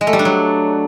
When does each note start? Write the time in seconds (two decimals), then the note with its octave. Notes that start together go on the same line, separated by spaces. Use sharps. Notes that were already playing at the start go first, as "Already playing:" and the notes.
0.01 G#3
0.07 A3
0.13 G3
0.19 D4
0.25 F#3